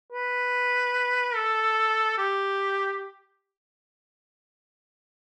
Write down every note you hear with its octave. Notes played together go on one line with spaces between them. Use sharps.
B4
A4
G4